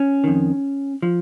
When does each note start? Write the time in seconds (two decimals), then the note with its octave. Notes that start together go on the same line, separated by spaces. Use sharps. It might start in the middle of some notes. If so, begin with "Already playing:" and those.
Already playing: C#4
0.24 F2 D#3
1.02 F3